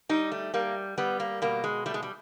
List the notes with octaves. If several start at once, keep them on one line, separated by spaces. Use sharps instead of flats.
G3 D#4
A3
G3 A#3
G3 B3
A#3
B2 A#3
G#3
G3 A3
G#3
G3